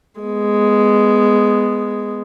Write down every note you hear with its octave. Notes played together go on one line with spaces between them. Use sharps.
G#3 B3